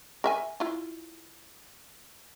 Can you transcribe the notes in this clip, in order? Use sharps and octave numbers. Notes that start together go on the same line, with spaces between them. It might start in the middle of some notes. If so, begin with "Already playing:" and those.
A#4 E5 G#5
E4 F4